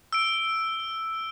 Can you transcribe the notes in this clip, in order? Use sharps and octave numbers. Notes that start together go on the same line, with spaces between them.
E6 D7